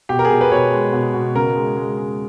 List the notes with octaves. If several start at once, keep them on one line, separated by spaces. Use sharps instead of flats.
B2 G4
A#4
G#4
B2
B4
B2 B4 C#5
G#3
B2
B2
C#3 A#4
G#3
G#3
G#3